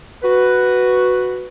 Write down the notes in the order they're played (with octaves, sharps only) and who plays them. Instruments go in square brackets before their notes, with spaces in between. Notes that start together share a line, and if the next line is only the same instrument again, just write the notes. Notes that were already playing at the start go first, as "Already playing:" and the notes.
[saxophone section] F#4 B4